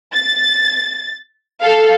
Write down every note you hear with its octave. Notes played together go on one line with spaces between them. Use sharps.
A6
A4 F5